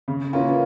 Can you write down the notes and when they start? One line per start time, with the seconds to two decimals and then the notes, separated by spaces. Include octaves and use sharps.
0.08 C#3
0.33 E3 A#3 C#4 F4